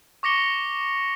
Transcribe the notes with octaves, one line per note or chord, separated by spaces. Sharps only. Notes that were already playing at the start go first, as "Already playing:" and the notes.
C#6 D6 A#6 C#7 G7